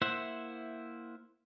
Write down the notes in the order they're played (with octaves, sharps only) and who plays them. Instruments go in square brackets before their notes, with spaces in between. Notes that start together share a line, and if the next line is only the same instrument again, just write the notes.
[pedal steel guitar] A#3 E4 C5 E5 F#5